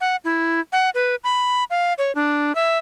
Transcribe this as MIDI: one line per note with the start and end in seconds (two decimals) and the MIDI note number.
0.01 0.16 78
0.24 0.60 64
0.72 0.90 78
0.94 1.15 71
1.24 1.64 83
1.70 1.93 77
1.98 2.14 73
2.15 2.55 62
2.55 2.78 76